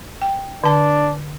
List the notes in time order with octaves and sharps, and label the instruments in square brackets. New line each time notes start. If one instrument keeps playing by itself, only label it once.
[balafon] G5
[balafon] D3 A5 [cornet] D4